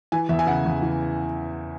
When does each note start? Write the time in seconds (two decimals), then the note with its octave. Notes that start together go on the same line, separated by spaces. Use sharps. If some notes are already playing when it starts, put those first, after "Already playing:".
0.12 E3 G#5
0.29 E2 E5
0.39 G#5
0.47 C#3 F#5
0.66 E2
0.82 E3